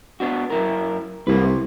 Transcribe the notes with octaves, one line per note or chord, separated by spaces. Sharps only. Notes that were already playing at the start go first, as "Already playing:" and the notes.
B3 D4 F#4
F#2 E4 A#4
C2 A#3 B4
C3